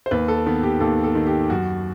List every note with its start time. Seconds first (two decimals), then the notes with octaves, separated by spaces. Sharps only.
0.06 C5
0.11 D#2 B4
0.28 A4
0.46 D#3 B3
0.63 G4
0.80 D#2 A4
1.04 A4
1.15 D#3
1.27 G4
1.50 F#2 F#4